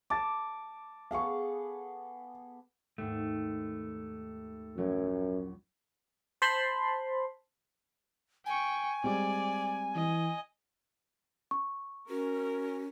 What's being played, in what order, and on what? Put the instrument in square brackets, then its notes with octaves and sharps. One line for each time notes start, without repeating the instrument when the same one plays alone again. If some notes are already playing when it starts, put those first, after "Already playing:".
[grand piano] A5 A6 [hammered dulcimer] D6
[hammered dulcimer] B3 G#4 A4 [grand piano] F5 C#6
[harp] D#2 G#2 [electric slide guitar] A3
[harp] A#1 F#3 G#6 [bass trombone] F#2
[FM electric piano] C5 A5 B5 C6
[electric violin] G5 C#6 [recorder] G#5
[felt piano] G3 G#3 C4 [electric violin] D5
[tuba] E3 [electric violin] D#5
[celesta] C#6
[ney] C#4 [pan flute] F#4 [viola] A#4